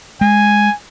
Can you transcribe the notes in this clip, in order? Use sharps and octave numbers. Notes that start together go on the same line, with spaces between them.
G#3 G#5